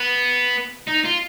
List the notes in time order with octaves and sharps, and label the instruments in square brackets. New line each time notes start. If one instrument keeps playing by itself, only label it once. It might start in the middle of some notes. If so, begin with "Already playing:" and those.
Already playing: [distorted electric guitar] B3
D#4
F4